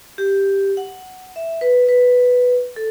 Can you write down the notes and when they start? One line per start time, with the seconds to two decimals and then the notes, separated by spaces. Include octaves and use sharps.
0.18 G4
0.77 F#5
1.36 E5
1.61 B4
1.89 B4
2.76 A4